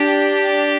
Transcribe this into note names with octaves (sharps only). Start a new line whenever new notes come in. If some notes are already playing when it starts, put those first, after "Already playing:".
Already playing: D4 G4